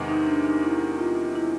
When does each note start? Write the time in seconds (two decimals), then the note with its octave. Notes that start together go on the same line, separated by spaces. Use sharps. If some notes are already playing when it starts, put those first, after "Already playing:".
Already playing: E2 C3 D#3 G#3
0.08 D#4
0.26 D4
0.45 D#4
0.63 E4
0.99 F4
1.36 E4